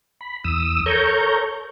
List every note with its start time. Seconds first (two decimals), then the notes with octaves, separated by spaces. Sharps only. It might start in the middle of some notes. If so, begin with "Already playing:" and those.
0.21 B5
0.44 E2 D#6 E6
0.86 A4 A#4 C#5 A#5 C#6 G6